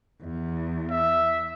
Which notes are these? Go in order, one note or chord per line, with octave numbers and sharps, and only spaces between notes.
E2
E5